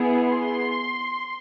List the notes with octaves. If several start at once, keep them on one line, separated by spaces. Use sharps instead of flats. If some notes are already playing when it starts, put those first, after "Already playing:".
Already playing: B3 E4 G#4
C6